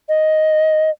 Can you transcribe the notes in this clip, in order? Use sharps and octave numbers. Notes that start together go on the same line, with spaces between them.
D#5